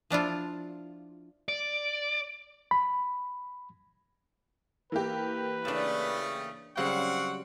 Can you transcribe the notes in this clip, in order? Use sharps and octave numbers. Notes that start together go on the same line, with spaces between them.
F3 D4 E4 F4
D5
B5
E3 A#3 G4 B4
C#3 A3 D4 A5
C#3 F#3 G3 C4 F5 F#5 C#6